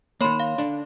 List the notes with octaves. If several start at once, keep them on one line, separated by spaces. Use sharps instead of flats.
D#3 A#3 C#5 B5 C6
F5
D3 D4